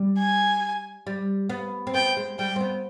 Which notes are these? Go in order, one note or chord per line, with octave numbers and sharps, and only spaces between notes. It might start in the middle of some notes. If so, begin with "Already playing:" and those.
Already playing: G3
G#5
G3
B3
C4
B3 G5
G#3
G3 G5
C4
B3